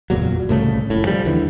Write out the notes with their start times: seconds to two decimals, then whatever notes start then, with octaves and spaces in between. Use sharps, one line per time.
0.10 F#1 E2 A#2 F#3
0.49 C2 A2 C#3 A3
0.90 F1 A2
1.05 F3 G3
1.25 D#2 D3 E3